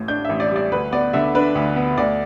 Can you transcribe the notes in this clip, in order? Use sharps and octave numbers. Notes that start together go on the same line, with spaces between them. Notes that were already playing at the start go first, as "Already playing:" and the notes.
Already playing: A1 A2
D4 G6
A1 E5
D5
G3 D5
D2 B4
B3 D5
D3 E5
D4 B4
D2
B3
D2 D5